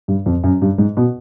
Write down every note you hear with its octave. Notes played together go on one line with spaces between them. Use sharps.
G2
F2
F#2
G2
G#2
B2